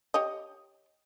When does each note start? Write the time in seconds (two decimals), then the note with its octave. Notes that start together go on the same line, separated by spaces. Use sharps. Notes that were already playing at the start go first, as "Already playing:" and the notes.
0.14 G4 C#5 D#5